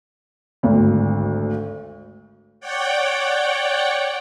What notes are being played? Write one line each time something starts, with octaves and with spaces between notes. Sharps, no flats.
G#1 D2
C#5 D5 F#5 G5